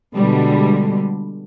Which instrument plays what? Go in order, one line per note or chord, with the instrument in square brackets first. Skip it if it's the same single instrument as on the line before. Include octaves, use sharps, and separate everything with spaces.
[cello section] B2 D3 G3 G#3